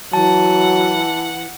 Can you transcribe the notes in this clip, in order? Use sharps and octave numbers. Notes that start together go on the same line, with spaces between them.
E3 F#3 F#5 A5